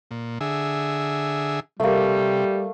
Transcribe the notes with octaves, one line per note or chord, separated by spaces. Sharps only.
A#2
D3 G#4 E5
C3 G3 A3 A#3